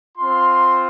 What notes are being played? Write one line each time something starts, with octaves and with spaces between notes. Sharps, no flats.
C4 F4 C6